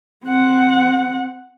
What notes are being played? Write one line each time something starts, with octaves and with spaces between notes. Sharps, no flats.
C4 F#5